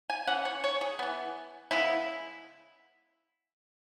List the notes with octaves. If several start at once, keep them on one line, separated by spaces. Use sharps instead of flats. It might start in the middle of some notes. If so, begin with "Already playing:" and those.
G#5
E3 C#4 F#5
C#5
C#5
G#4
E3 B3
C#3 G#3 B3 E4